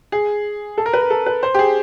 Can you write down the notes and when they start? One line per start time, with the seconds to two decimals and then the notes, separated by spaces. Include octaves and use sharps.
0.12 G#4
0.78 A4
0.86 A#4
0.94 B4
1.01 A#4
1.10 A4
1.26 B4
1.43 C5
1.55 G4
1.59 G#4